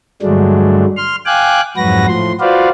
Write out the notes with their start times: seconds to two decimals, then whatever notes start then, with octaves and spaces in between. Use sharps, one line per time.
0.22 G2 D3 F#3 G#3 A3 D4
0.97 C6 F6
1.26 F5 G5 G#5 D6 F#6
1.77 F2 G#2 F#3 F#4 B4 A#6
2.08 A2 F3 C6
2.40 F4 F#4 B4 C5 D5 F5